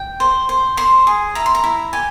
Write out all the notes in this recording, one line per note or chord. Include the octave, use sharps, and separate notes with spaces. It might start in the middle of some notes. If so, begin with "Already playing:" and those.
Already playing: G5
C5
C5
C5 C6
G#4
E4 A#5
C6
A#5
E4
G4 G#5